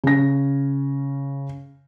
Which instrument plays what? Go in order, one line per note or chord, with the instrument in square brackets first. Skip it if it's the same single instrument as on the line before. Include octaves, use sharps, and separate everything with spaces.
[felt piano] C#3 A#6